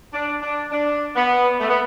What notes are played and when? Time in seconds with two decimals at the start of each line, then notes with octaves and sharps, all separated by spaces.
0.13 D4
0.42 D4
0.71 D4
1.16 B3
1.60 A3
1.68 B3